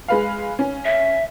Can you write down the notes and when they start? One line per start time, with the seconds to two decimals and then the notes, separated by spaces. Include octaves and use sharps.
0.08 G#3 B4 F5
0.59 C#4
0.85 E5